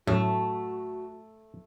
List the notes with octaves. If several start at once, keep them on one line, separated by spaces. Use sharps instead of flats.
F#2 A2 A3 F#4